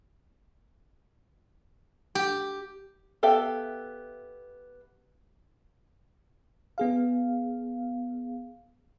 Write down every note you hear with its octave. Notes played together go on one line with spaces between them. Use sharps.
G4
B3 G4 A4 E5 F5
B3 G#4 F5